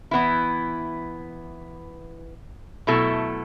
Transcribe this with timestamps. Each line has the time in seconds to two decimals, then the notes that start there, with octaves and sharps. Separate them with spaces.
0.11 E3 B3 E4
2.87 B2 F#3 A3 E4 A4